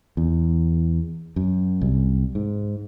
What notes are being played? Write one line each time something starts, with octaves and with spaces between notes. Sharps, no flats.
E2
F#2
C2
G#2